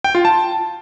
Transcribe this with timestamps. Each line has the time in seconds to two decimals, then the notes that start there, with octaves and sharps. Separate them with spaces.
0.04 G5
0.15 F4
0.25 A5